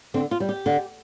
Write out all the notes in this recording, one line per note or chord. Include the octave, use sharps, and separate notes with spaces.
D3 C4
F4
G3
G4
D3